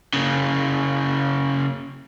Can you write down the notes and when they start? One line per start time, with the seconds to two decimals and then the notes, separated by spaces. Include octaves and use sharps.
0.14 C#3 A#3